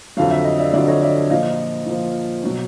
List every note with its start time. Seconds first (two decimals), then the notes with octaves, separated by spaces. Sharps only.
0.17 F2 D3 F#3 F5
0.30 E5
0.44 D#5
0.59 D5 E5
0.73 F2 D3 F#3 D5 E5
0.88 C#5 D#5
1.02 D5 E5
1.30 A#2 F3 D#5 F5
1.86 A#2 F3
2.44 B2 F#3